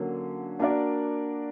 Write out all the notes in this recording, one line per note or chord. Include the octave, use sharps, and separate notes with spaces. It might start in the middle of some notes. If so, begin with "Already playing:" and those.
Already playing: D3 F#3 A#3 C#4
A#3 D4 F#4 A#4 D5